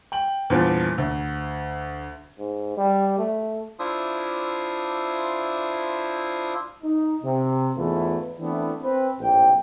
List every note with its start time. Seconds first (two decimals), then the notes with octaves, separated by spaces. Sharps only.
0.12 G5 F#7
0.50 E2 G2 A#2 F3
0.98 D2
2.39 G#2
2.77 G3
3.19 A3
3.79 D4 E4 F4 C5 E5 D#6
6.84 D#4
7.23 C3
7.76 E2 G#2 A3 E4 F4 B4
8.39 E3 A3 B3 C4 D4 E4
8.82 C4 B4
9.19 A#1 A2 C3 A#3 G5